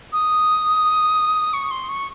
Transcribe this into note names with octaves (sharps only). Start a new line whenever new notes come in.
D#6
C#6
C6
C#6